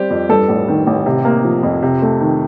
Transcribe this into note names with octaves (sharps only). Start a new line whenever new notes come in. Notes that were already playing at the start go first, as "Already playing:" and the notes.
Already playing: G3 C4 G4
F2
G2 A4
A1
D#3
A1
C3
A#3
F3
F2
C3
A3
D#3